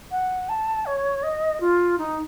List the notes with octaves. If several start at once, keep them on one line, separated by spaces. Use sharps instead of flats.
F#5
A5
C#5
D#5
F4
D#4